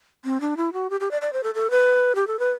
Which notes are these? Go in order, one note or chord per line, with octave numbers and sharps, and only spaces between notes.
C4
D4
E4
F#4
G4
G4
D5
D5
C5
A4
A4
B4
G4
A4
B4